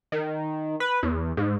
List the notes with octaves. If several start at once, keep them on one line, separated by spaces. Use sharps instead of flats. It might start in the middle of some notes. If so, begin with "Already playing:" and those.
D#3
B4
E2
G#2